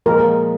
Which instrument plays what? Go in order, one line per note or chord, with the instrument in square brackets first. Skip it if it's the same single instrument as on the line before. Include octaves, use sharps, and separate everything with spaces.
[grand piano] A#2 F3 G#3 [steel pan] A#4